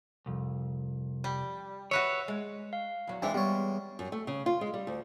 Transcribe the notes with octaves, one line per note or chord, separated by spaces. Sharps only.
C2 F2
G3
F#4 B4 C#5 E5
G#3
F5
E2 F#3
E2 E3 G#3 C4 D4 E5
G3 B3 C#5
F#2
A3
C#3
F4
G#3
G3
D2